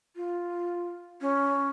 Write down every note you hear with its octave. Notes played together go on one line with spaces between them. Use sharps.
F4
C#4